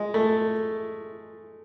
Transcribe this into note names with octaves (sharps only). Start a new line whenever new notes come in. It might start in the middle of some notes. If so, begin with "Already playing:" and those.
Already playing: G#3
A3